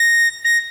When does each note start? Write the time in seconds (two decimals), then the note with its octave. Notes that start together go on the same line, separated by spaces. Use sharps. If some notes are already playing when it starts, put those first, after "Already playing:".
Already playing: A#6
0.45 A#6